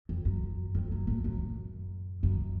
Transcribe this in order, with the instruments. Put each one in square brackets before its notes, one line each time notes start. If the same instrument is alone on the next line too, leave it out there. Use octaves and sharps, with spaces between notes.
[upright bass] F2
F#2
F2
F#2
A2
F#2
F#2